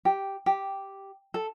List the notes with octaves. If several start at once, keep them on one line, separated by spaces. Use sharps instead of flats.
G4
G4
A4